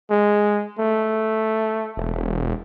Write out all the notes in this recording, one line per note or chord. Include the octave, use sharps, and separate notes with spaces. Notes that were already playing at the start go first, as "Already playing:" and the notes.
G#3
A3
E1